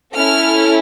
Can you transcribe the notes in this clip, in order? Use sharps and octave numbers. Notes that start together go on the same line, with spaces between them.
C#4 E4 A4 F6